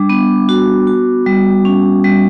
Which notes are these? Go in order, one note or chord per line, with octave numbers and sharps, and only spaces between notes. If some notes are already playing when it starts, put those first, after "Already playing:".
Already playing: G3 D4 D6
B3
F#4
F#4
G3
C#4
G3